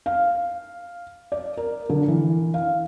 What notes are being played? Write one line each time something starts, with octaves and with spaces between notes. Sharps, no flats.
F5
D5
A#4
D3
E3
F5